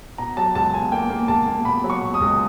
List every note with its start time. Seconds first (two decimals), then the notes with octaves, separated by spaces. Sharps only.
0.18 B2 A#5
0.37 F#3 A5
0.55 C#2 A5
0.73 B2 G#5
0.92 A#3 G5
1.10 A#3
1.28 C#2 A5
1.47 A#3
1.65 B2 B5
1.84 F#3
1.90 C#6
2.02 B2
2.14 D#6
2.21 C#2